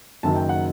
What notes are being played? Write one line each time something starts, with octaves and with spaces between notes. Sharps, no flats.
F#1 F#2 D#3 F#3 A5
G5
F#5